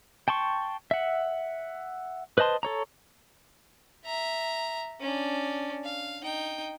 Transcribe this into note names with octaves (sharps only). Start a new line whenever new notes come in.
G5 A5 C6 C#6
E5 F#5
B4 C5 D#5 A5 C6
A4 C#5 A#5
E5 A#5
C#4 D4
F5
D#4 G5